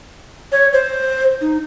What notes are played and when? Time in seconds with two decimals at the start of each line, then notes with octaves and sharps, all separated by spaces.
0.52 C#5
0.73 C5
1.41 D#4